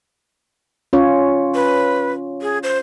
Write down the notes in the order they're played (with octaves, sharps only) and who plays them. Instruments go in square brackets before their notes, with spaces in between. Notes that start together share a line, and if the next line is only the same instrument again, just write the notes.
[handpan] C#4 F4 C#5
[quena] B4
G#4
C5